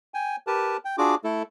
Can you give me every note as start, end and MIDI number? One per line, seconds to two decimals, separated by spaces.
0.14 0.36 79
0.14 0.36 80
0.47 0.77 67
0.47 0.77 70
0.47 0.77 71
0.47 0.77 81
0.85 0.96 79
0.98 1.15 62
0.98 1.15 65
0.98 1.15 66
0.98 1.15 68
0.98 1.15 86
1.24 1.43 57
1.24 1.43 64
1.24 1.43 69